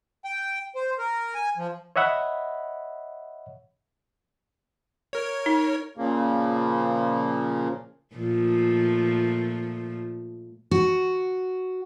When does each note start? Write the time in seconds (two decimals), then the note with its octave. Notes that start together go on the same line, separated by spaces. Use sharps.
0.25 G5
0.75 C5
0.98 A#4
1.35 G#5
1.57 F3
1.96 C#5 D#5 E5 F#5 B5
5.13 A#4 C#5
5.46 D#4
5.98 A#2 C#3 F3 A#3
8.15 A#2 F3 A3
10.71 F#4